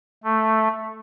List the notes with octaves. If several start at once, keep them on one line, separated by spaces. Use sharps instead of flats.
A3